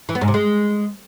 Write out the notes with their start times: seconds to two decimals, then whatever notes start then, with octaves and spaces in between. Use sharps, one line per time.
0.09 E3
0.15 B3
0.21 G#2
0.28 C3
0.34 G#3